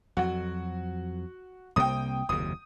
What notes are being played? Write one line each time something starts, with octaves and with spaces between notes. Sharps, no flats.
F2 F#3 F#4
C2 C3 A#3 G5 D#6
F#1 D#2 C3 D#6